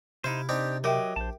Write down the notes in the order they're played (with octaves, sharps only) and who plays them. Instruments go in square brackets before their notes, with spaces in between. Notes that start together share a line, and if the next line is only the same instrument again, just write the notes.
[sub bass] C3 [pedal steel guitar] D#4 C5 [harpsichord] E4 F5
[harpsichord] C4 D4 D#4 [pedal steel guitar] G4
[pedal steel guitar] F#3 D#5 D6 [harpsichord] G4 [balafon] A#4 E5 G5
[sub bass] A#1 [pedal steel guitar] C5 A5